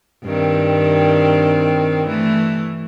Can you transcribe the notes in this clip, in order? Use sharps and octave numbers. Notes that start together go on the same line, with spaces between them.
G2 D#3 C4
E3 A3